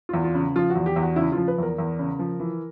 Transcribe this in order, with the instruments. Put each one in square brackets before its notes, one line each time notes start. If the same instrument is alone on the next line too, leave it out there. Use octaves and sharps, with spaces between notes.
[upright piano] E2 F4
F4
C#3
F3 F4
F#4
E2
G4
E2
F#4
C#3 E4
F3 F4
B4
E2 A#4
E2
C#3
F3
E3